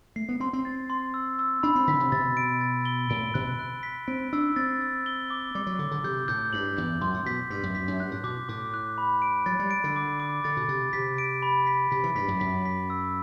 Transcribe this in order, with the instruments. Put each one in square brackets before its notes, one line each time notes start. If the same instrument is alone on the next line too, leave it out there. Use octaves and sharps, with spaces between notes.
[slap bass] A3 [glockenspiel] C7
[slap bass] B3
[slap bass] C4 [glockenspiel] C6
[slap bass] C4
[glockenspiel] A6
C6
E6
E6
[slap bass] D4 [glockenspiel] B5
[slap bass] C4
[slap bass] D3 [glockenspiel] B6
[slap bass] C3
[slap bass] B2 [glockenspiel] A6
[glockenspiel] D7
A6
G7
[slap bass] A2 [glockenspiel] D7
[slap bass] B2 [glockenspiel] F#6
[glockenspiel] F#6
B6
[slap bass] C4 [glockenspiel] D7
[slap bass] D4 [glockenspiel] E6
[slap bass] C4 [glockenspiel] A6
[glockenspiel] E6
G7
D6
[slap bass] G3 [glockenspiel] D6
[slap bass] F#3
[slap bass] D3 [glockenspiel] D6
[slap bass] D3
[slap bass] C3 [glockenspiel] G6
[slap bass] A2 [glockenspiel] G6
[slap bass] G2 [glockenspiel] F#7
[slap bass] E2 [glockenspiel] G6
[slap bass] F#2 [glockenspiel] C6
[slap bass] A2
[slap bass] B2 [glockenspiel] B6
[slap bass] G2 [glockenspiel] B6
[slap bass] F#2
[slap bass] F#2 [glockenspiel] B6
[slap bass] F#2
[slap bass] G2 [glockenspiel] F#6
[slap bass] A2
[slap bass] B2 [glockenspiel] D6
[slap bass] A2 [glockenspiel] D6
[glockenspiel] F#6
B5
D7
[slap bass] F#3 [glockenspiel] A6
[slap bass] G3
[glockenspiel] D7
[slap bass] D3
[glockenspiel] D6
D6
[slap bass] D3 [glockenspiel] A6
[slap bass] B2
[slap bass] C3 [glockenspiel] A6
[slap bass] C3 [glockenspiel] B6
[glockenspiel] D7
B5
B6
[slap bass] C3 [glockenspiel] B6
[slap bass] E3
[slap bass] G2 [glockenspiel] B6
[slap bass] F#2
[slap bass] F#2 [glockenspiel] B6
[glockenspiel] B6
E6